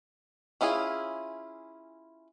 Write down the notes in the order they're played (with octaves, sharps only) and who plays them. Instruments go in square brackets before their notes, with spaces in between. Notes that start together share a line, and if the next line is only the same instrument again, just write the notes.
[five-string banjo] C#4 E4 F4 G#4